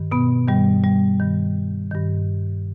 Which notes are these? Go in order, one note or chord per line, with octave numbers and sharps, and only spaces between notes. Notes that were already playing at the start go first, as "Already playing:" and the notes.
Already playing: G2 D#3
B2 B3
G2 D#3 G3
G3
G2 D#3
G2 D#3